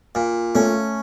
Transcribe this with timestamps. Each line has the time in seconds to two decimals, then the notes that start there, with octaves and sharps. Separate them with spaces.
0.15 A#2
0.55 A3 C#4